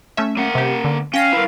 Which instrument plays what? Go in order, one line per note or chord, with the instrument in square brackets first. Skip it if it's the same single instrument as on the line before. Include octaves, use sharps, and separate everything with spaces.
[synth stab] A3 C#4 E5
[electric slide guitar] A#3 F#5
[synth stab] C3 G4
D3
[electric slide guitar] C#4 [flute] F5 [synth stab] G5 A#6 C7
[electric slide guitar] E4 A#4 [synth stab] B4